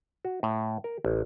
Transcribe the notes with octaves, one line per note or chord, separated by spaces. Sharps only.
F#4
A2
A#4
A1